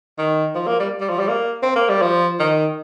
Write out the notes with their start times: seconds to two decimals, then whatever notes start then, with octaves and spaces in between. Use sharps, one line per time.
0.18 D#3
0.55 F3
0.67 A#3
0.80 G3
1.00 G3
1.09 F3
1.19 G3
1.28 A#3
1.62 C4
1.76 A#3
1.89 G3
2.02 F3
2.39 D#3